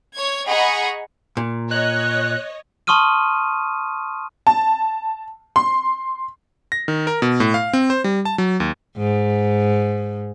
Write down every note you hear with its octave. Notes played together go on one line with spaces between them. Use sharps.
C#5 G#6
G#4 D#5 F#5 A#5 B5 C#6
A#2
C#5 D#5 F#6
A5 C6 C#6 D#6 F6 D#7
A5
C6
A#6
D#3
A#4
B2
A2
F5
C4
C5
G3
A5
F#3
D#2
G#2